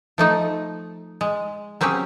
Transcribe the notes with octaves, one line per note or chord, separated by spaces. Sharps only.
F3 A3 D#4
G#3
F#3 C4 C#4 G4 G#4